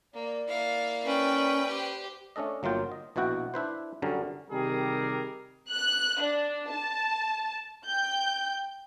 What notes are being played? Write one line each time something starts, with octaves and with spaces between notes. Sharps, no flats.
A#3 D5
A#3 E4 F5
C#4 B4 G5
G4 C5
A3 C#4 D4 A4 D#5
G1 F#3 A#3 F4 G5
D#5
A#1 B2 E4 F#4 F#5 G5
D4 E4 B4 C5
F#2 D3 F#3 G3 C#4 A#4
C3 D#3 G3 G4 G#4 A#4
F#6
D4
A5
G5 G6